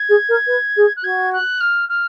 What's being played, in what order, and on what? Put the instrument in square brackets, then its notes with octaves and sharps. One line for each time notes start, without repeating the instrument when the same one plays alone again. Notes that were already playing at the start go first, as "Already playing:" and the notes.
Already playing: [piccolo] G#6
[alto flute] G#4
A#4
B4
G#4
[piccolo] F#6
[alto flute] F#4 [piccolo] G#6
[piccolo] F#6
F6
F6